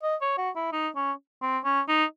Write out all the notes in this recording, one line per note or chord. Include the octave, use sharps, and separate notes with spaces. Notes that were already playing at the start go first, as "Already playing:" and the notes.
D#5
C#5
F#4
E4
D#4
C#4
C4
C#4
D#4